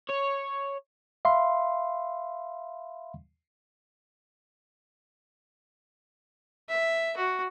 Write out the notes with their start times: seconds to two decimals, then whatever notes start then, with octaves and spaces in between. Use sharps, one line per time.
0.10 C#5
1.25 E5 F5 B5 C6
6.69 E5
7.17 F#4